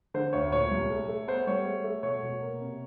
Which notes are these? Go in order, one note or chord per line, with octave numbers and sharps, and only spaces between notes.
D3 C5
D2 C#5
A#2 C#5
C2
A3
A3
B3 C5
G3 C#5
A3
A3
B2 C#5
B2
A#3
C3